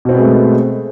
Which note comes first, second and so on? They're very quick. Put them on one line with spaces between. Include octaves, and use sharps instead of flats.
B2 C4 B3 G#3 A3